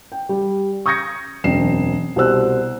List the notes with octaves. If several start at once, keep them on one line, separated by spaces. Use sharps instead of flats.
G5
G3
C#6 D#6 G6 G#6 A#6 C#7
E1 F#2 C4 C7 E7
C2 B2 C5 E6 F#6